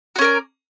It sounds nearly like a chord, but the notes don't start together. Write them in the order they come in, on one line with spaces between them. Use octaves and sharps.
F#4 C#4 A#4 D5